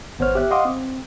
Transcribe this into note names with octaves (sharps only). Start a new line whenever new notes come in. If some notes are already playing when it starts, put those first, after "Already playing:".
G#1 B3 C5 C#5 F6
G4 E5 F#6
D#5 F5 F#5 C6 D6 D#6
C4